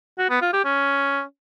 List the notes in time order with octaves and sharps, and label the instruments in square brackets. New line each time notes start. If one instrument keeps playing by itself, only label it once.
[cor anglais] F#4
B3
F4
G4
C#4